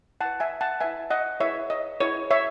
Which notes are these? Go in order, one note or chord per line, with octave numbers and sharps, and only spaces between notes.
E4 B4 F#5 A5
E5 G#5
F#5 A5
E4 B4 E5 G#5
D#5 F#5
E4 G#4 B4 C#5 E5
D#5
E4 G#4 B4 C#5
C#5 E5